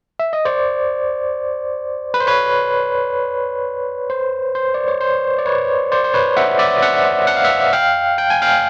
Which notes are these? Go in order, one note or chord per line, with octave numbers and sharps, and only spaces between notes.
E5
D#5
C5 D5
B4
C5
B4 C#5
C5
C5
D5
C#5
C5
D5
B4 C#5
C5 D5
C5
B4 C#5
E5 F#5
D5 E5
E5 F#5
F#5
F5
E5 F#5
F5 G5
G5
G#5
F5 G5